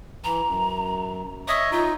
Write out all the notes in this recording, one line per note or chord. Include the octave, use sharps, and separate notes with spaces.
E3 A#5
F#2
C#5 D#5 E5 D#6
D#4 F4